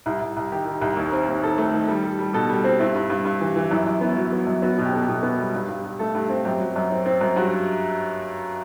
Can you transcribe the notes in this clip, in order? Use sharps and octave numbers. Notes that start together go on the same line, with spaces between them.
C2 E4
C2
C2
D#3 G4
D#3
C2
D#2
C4
D#2
D#2 A4
A3
D#3
G3
G3
G3
B2 A4
G3
C4
G2 E4
G2
G2
G2
E3
E3
F#2 E4
F#2
B3
F#3
B3
F#2
B3 F#4
B2
G4
B3 A4
G4
B2
B3
G3
G2
G2
G2
A3 A4
G2
C4
F#2 G4
F#3
F#2
C4
C4
F#2
G2 F#4